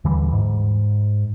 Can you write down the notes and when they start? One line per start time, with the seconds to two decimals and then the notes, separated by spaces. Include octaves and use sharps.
0.04 D#2 D3 E3 G3
0.33 G#2